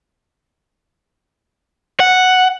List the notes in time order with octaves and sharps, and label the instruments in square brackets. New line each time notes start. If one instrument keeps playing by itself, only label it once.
[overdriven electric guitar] F#5